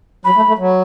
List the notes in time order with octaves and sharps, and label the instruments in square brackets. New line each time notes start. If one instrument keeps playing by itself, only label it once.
[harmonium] F#3 [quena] B5
[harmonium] A3
A3
F#3